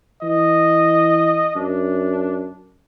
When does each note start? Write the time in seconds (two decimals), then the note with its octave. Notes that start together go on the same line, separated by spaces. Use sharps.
0.22 E3 D#5
1.56 F#2 D4